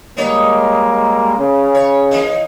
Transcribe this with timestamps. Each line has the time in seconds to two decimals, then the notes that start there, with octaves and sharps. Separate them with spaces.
0.17 G3 G#3 A#3 B3 D#4 C#5
1.37 C#3
1.75 C#5
2.11 E3 A#3 D#4